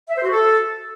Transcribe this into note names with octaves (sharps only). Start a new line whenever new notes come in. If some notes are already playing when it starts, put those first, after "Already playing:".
E5
C5
F#4
A4